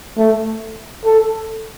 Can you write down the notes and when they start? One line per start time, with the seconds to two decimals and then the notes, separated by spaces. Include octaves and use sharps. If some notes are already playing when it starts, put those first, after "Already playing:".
0.18 A3
1.05 A4